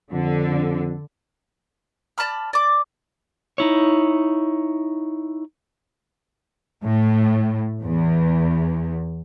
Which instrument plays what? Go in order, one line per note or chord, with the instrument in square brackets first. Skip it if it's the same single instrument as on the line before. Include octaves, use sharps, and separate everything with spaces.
[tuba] F2 [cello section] D3
[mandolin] D5 A5 B5 F6
D5 D6
[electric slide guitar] D#4 E4 C#5
[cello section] A2
E2